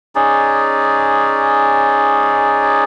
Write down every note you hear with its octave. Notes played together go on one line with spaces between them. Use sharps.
C#4 D#4 G#4 D5